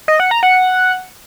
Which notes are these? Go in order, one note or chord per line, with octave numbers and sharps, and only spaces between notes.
D#5
F#5
A#5
F#5